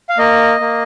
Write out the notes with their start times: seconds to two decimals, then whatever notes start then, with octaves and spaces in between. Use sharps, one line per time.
0.09 F5
0.18 A#3 D#5
0.60 A#3